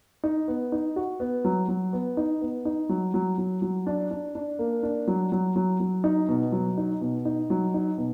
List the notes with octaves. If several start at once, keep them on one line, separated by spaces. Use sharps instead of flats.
D#4
B3
D#4
F#4
B3
F#3
F#3
B3
D#4
B3
D#4
F#3
F#3
F#3
F#3
D4
D4
D4
A#3
D4
F#3
F#3
F#3
F#3
D#4
B2
F#3
D#4
B2
D#4
F#3
D#4
B2